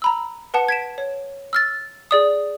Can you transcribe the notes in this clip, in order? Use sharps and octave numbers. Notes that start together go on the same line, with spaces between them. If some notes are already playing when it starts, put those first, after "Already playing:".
A#5 B5 E6
B4 F#5 A5 C#7
G#6 B6 D7 E7
C#5
E6 F6 A6
G#4 D5 D#6